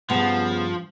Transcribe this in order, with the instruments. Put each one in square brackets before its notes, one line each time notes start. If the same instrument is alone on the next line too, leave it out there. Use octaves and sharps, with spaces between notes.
[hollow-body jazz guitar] G2 [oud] C#3 B3 [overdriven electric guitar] F3